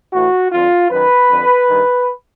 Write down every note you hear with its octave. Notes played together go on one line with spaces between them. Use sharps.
A2 E3 F#4
F2 D3 F4
F#2 D#3 B4
F2 D3
G2 D#3